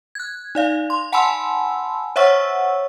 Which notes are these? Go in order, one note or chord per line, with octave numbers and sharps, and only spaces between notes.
F#6 G#6
D#4 D5 F5
C6
F#5 G#5 A5 B5 C6 E6
C5 C#5 E5 F#5 C#6 E6